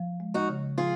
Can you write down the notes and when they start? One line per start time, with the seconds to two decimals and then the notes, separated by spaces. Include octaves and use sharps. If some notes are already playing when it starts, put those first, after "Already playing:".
Already playing: F3
0.20 G#3
0.34 D#4 F#4
0.49 C#3
0.78 F3 F4 G#4